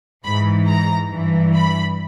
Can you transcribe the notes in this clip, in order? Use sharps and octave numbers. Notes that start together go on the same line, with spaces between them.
G#2 E3 B5
A#5
G2 E3
B5